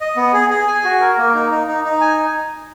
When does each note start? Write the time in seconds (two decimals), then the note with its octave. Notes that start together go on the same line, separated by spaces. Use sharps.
0.01 D#5
0.16 B3
0.33 G#4
0.50 G#4
0.68 G#5
0.84 F#4
1.00 A#4
1.18 A#3
1.34 D#4
1.51 D#4
1.67 D#4
1.84 D#4
2.01 G#5